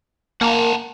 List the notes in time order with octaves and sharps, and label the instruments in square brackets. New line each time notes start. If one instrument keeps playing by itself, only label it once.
[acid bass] A#3 [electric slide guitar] F#5 A5 A#5